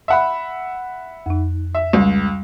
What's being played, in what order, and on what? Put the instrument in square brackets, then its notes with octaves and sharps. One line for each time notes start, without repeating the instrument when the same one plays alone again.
[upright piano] E5 F#5 B5
[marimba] F2 D#4
[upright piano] E5
[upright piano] C#2 [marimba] G3